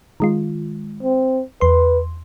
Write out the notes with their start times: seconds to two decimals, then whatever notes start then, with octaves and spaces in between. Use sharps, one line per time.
0.20 D#3 G#3 F4
1.03 C4
1.61 E2 B4 C6